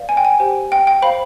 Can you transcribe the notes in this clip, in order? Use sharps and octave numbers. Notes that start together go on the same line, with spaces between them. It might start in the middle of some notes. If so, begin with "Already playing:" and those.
Already playing: B4 D5 F5
G#5
G5
G#5
G4 C5 G5
G5
G5
C5 F5 B5